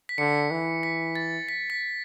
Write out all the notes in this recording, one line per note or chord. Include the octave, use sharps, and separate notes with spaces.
B6
D3 C#7
E3
B6
A6
B6
B6